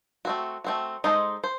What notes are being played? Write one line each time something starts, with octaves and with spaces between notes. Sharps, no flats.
A3 C4 F#4
A3 C4 F#4
G#3 D#4 A4 C5
C5